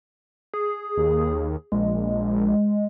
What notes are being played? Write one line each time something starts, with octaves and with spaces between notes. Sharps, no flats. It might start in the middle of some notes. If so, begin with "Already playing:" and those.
G#4
D#2
A#1 G#3